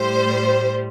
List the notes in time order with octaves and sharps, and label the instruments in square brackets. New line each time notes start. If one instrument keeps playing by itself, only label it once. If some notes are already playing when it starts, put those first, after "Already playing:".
Already playing: [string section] A2 G3 C5